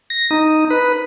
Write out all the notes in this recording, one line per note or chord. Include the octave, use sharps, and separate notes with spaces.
A#6
D#4
B4